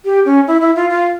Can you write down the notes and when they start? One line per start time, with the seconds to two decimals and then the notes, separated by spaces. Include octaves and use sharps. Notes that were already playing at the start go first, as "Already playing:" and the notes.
0.05 G4
0.25 C#4
0.48 E4
0.61 E4
0.76 F4
0.90 F4